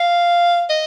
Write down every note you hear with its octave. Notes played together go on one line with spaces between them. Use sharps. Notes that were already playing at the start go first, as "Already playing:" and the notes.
Already playing: F5
D#5